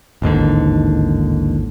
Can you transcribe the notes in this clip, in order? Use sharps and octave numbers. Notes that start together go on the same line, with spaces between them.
A1 D#2 G#2 D3